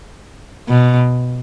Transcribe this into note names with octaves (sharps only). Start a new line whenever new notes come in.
B2